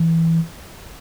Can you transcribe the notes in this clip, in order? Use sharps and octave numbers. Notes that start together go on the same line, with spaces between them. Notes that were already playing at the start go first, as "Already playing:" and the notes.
Already playing: E3